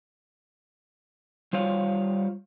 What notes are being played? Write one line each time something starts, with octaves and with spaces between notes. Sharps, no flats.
G3 F4 C5 C#5 F5